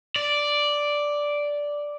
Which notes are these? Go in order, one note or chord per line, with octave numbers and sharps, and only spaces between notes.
D5